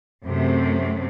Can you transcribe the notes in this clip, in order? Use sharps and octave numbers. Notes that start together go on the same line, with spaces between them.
F#2 C3 A3